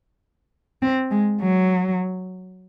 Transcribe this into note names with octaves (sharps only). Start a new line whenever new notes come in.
C4
G#3
F#3